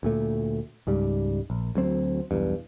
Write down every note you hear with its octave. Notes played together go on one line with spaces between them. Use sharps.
D2 A#2 A3
C#2 G#2 G3
A#1
D2 F#3 C4
B1 E2 G2